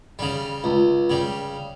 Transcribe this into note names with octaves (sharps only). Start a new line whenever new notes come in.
C#3 G3
C#2
C#3 G3